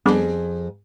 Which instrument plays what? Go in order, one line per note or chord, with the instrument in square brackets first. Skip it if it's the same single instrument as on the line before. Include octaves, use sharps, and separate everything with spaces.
[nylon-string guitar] F2 G#4 [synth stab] G3 B3 D4